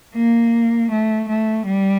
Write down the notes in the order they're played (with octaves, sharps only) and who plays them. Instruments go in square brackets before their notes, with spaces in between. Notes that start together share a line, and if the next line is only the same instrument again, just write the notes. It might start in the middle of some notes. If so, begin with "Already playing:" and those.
[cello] A#3
A3
A3
G3